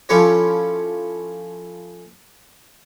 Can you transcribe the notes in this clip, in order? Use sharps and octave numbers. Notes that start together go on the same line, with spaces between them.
F3 A3 C#4 E4 G4 C#5